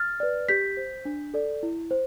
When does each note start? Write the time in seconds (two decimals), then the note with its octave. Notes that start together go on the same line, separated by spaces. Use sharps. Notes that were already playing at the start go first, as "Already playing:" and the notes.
Already playing: F6 A6
0.20 B4 D5
0.49 G4 G6 B6
0.77 C5
1.05 D4
1.34 A4 D5
1.63 E4
1.91 C5